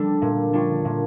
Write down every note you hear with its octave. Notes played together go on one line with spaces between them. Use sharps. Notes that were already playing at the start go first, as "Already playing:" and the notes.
Already playing: D3 G3 D4 A4
A#2
G3 D4 F4 C#5
A#2